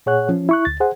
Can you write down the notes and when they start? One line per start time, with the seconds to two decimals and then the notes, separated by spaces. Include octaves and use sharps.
0.06 A#2 G#4 C#5 F#5 F#6
0.29 F3 C#4
0.49 E4 C#6 F#6
0.65 D2 A6
0.80 G#4 C5 F#5